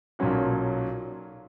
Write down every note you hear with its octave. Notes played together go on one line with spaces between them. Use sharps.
B1 A#2 F#3 C#4 F#4